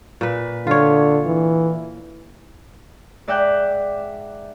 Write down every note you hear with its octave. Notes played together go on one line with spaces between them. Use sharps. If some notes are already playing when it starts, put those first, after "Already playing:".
A#2 B4
D3 F4 C#5
E3
G#2 D5 E5 F#5 G5 G6